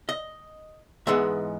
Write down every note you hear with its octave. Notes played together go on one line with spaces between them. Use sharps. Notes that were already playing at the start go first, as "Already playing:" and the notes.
D#5
G#2 E3 G#3 B3 E5